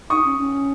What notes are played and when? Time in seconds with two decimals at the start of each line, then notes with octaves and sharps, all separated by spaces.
0.10 D#4 C#6 D#6
0.25 C#4
0.39 C#4